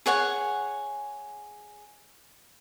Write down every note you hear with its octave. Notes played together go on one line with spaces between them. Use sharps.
G#4 C#5 F#5 G#5